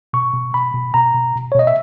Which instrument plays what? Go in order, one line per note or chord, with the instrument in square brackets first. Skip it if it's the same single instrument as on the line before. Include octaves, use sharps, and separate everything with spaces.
[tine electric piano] B2 C#6
B2
B2 B5
B2
B2 A#5
B2
B2
C#5
B2 D#5
E5